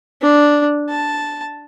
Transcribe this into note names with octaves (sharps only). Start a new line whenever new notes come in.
D4
A5